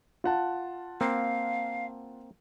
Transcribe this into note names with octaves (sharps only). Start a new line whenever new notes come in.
F4 F#5 A5
A#3 C4 F5